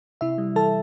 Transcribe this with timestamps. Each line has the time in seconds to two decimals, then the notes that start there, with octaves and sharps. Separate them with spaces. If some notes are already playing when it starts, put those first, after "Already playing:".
0.21 C3 E4 E5
0.38 G3
0.55 E3 A4 A5